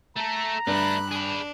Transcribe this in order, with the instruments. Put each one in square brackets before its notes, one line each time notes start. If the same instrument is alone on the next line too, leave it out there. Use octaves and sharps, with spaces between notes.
[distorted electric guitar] A3 A4 [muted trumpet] A#5
[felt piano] G2 [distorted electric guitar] A3 D4 [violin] B5 F#6
[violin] D4 [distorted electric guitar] G#4 B5